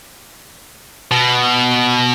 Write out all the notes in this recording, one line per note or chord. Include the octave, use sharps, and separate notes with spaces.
B2